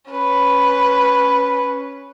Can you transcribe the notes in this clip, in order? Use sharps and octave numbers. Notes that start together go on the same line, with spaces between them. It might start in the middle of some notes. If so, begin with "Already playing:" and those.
C#4 B4